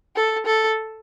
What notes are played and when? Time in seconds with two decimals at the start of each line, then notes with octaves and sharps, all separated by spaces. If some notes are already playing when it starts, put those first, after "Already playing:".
0.16 A4
0.46 A4